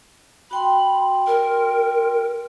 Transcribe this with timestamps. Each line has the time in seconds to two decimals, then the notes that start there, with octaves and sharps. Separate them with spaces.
0.51 F#4 G5 B5 C6
1.27 A#4